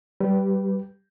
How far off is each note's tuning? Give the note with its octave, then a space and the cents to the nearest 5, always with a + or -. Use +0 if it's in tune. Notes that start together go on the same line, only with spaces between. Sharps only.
G3 -20 G4 -10 B4 +0